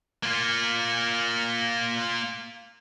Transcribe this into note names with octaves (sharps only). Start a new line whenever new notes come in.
A#3 F4